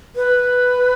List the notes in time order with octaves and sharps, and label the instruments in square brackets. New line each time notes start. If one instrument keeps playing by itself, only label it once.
[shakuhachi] B4